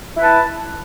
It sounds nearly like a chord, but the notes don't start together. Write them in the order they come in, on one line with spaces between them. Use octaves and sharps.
E4 B4 A5